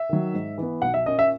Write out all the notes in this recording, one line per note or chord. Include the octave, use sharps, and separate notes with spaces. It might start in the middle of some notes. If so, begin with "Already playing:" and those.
Already playing: E5
D#3 F#3
G#2
E3 B3
B1 F#5
E5
A#2 A#3 C#4 D#5
E5